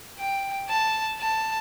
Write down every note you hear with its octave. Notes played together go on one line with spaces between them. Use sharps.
G5
A5
A5